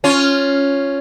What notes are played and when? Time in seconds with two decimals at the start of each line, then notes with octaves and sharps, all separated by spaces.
0.04 C#4 F4